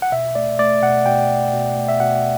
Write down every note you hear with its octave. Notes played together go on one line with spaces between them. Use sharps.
F#5
B2 E5
A3 D5
A3 D5
B2 F#5
B2 G5
B2
B2
A3
E5
B2 F#5